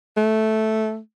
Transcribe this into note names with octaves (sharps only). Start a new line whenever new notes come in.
A3